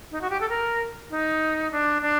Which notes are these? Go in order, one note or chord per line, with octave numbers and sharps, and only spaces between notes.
D#4
F#4
G4
A4
A#4
D#4
D4
D4